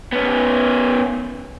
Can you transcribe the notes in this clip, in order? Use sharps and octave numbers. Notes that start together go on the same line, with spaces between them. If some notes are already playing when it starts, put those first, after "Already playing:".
B3 C#4